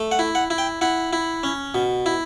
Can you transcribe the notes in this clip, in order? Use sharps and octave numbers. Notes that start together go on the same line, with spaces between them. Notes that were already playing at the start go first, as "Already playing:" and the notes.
Already playing: A3
F#5
E4
F#5
E4
G5
E4 F#5
E4
C#4
B2
E4